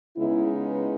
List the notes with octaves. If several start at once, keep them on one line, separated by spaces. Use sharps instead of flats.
C#3 G#3 B3 D#4 E4
E4